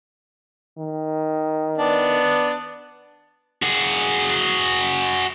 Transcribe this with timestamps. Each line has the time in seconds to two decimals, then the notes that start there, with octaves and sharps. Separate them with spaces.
0.78 D#3
1.78 B3 D4
3.62 F#4 G#4